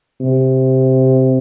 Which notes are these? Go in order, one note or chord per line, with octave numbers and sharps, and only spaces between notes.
C3